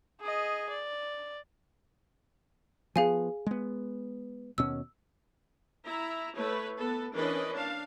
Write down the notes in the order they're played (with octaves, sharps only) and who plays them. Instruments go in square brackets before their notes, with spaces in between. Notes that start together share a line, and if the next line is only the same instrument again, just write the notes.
[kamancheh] G#4 D#5
D5
[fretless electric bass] F3 B3 [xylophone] G#4 F5 G#5
[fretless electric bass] G#3 B3
[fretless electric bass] D#2 B2 C#4 [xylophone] E6
[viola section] E4 E5 A#5
A3 E4 B4 C#5
B3 A4 B4
E3 C#4 D4 A#4 B4 D#5
D4 F5 A5